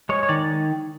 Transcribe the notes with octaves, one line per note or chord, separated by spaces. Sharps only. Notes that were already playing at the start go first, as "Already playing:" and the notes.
G#3 C#5
C#5
D#3 D5